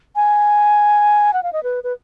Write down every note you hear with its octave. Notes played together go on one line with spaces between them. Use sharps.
G#5
F#5
F5
D#5
B4
B4